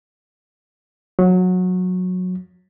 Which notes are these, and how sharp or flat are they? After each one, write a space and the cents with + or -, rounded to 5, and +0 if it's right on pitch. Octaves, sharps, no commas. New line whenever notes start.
F#3 -20